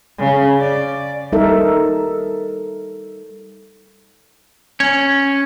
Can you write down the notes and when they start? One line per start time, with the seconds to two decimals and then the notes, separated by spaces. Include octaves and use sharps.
0.18 C#3
0.60 D5
1.32 G3 D#4 A4 A#4 E5
4.80 C#4